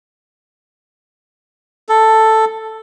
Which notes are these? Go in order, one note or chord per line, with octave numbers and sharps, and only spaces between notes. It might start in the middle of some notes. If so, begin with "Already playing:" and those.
A4